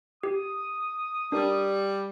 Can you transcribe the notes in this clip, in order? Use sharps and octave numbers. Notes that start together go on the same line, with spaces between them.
G4 D#6
G3 D4 A#4